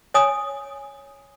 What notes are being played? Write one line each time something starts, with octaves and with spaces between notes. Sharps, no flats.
C#5 G#5 D#6